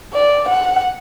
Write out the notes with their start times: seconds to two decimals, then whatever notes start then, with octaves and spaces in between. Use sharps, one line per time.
0.14 D5
0.49 F#5